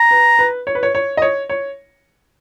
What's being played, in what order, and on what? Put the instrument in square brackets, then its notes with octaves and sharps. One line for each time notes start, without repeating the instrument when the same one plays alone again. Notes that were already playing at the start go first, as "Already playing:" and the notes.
Already playing: [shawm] A#5
[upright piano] B4
B4
C#5
B4
C#5
C#5
D#5
C#5
C#5